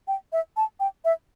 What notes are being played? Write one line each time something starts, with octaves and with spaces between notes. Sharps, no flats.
G5
E5
A5
G5
E5